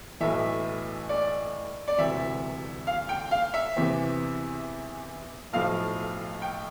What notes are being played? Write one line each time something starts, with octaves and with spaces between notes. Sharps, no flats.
B1 A2 E3 E5
D5
D5
E1 D2 C3 E3 E5
F5
G5
F5
E5
E2 C3 E3
B1 A2 F3 F5
G5